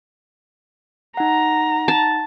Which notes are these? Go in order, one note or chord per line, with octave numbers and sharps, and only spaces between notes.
D#4 F#5 A#5
A5